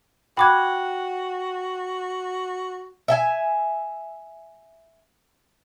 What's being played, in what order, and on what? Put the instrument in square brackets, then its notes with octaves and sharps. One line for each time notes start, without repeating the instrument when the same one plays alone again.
[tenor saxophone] F#4 [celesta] G5 F#6 [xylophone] B5 D6 G#6
[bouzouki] E5 G5 G#5